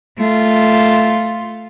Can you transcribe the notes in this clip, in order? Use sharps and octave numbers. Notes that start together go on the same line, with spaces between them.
A3 F4